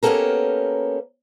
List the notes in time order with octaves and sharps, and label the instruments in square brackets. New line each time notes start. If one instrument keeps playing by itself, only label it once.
[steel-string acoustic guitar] A#3 B3 C#4 G4 A4 A#4